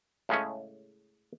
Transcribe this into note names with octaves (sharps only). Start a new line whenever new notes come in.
A2 C#3 G#3 A3 C#4